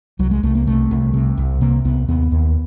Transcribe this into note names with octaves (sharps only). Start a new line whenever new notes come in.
C2 F#3
G#3
C2 A3
A#3
C3 A3
C2
C3
C2
C3 A#3
C2 B3
D#2 B3
D#2